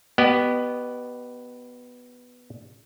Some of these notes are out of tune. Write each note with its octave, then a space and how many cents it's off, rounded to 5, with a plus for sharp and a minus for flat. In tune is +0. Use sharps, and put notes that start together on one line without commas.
B3 +0 G4 -30 D#5 -35